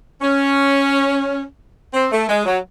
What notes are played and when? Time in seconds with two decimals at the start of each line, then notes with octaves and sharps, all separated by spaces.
0.21 C#4
1.94 C4
2.11 A3
2.29 G#3
2.46 F#3